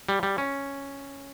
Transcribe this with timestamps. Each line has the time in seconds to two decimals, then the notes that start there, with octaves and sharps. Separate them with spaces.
0.09 G3
0.23 G3
0.38 C#4